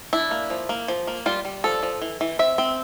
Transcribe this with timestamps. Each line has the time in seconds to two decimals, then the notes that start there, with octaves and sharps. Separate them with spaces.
0.13 D4 E4
0.31 A#3
0.50 F3
0.69 A#3
0.88 F3
1.07 A#3
1.26 G3 F4
1.45 G3
1.64 F3 A4
1.83 F3
2.01 E3
2.21 E3
2.39 C4 E5
2.58 C4